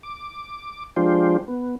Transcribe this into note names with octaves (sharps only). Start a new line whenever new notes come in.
D6
F3 G#3 D4 F4 G4 C5
B3